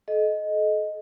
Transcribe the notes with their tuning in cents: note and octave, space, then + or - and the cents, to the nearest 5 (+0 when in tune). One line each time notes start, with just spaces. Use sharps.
A4 -40 D#5 +0